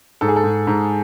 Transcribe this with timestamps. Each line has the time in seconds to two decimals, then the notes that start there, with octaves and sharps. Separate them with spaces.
0.21 G#2 A4
0.28 G#4
0.36 A4
0.44 G#2
0.67 G#2